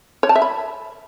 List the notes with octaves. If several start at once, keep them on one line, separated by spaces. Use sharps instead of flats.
C#5
A5
E5
B5